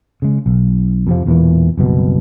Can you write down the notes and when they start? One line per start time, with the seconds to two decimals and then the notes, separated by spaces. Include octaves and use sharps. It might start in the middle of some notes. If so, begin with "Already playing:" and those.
0.22 C#3 G#3
0.46 B1
1.07 F2 C3 F3
1.26 E1 E2 A#2 E3
1.77 F#1 C2 B2